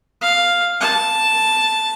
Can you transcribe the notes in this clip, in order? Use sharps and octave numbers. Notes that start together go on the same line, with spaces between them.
F5
A5